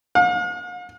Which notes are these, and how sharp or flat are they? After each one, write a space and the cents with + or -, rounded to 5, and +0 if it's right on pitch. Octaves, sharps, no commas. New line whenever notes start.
F5 +45